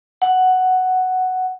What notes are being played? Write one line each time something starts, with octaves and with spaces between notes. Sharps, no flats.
F#5